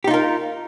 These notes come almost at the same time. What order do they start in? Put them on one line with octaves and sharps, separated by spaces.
G4 D#4 F4 A#4